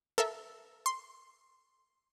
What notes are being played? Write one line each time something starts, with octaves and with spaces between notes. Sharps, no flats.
A4 A#4 E5
C6